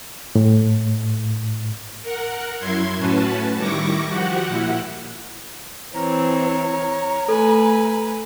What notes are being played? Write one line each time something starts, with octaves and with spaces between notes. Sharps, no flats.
A2
A#4 F#5
F#2 F#3 E4 C6 G#6
A2 C#4 F#4 B4 A5
D#3 G3 E4 C#6 D6 A#6
F3 F#4 G4 F#5
A#2 E4 F#5
E3 C4 C#5 A#5
A3 A4 B4 G#5